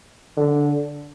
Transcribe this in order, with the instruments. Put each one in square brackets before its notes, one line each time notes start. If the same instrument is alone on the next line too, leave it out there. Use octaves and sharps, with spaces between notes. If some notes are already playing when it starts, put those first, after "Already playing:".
[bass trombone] D3